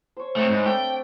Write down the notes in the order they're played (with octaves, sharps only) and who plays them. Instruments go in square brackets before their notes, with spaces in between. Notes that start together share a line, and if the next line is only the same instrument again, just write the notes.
[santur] C5 C#5
[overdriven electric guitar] A3 C4
[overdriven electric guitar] G#2 [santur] B5
[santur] A3 C4 D4 [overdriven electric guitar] G5